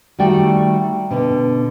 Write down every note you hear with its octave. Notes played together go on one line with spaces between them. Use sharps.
D#3 G3 A3 F#4 D5 G5
B2 D3